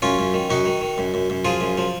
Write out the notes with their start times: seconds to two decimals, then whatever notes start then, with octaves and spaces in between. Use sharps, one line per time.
0.02 F#2 C#4 F4
0.19 F#2
0.34 D#3
0.50 F#2 D#4 F#4
0.66 D#3
0.81 D#3
0.98 F#2
1.14 F#2
1.30 F#2
1.45 F3 F4 G#4
1.61 F#2
1.78 F3